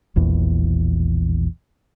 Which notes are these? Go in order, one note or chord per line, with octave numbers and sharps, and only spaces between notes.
E1 A#1 E2